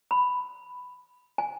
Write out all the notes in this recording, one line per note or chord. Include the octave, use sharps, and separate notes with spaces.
B5
G#5